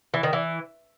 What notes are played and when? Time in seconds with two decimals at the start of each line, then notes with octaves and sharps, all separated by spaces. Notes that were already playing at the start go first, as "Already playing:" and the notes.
0.14 E3
0.23 D#3
0.33 E3